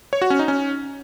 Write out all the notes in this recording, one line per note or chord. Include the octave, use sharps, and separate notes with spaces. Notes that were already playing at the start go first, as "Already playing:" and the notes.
C#5
F#4
C#4
D#4
C#4